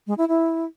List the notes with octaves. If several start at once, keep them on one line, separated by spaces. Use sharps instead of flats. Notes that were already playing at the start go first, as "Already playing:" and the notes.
G#3
E4
E4